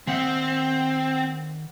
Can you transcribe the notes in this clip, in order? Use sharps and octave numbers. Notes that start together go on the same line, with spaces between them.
D#3 C4 E5 F#5